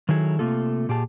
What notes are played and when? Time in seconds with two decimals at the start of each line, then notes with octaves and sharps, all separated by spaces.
0.09 D#3 F#3 E4 G#4 A4
0.39 C3 F#3 A3 A#3 F4 A4
0.89 A#2 G4 G#4 A5